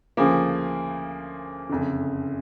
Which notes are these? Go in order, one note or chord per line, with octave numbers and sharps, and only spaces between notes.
D2 C#3 F3 A#3
F#1 F2 D3